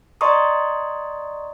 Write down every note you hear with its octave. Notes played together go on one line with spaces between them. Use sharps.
D5 D#5 A#5 C6 C#6 D#6